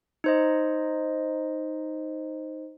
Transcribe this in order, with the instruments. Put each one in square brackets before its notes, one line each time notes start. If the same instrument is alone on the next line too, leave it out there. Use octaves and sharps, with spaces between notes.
[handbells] D#4 C5 D#5